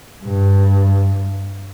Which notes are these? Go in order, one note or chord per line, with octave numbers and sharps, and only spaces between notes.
G2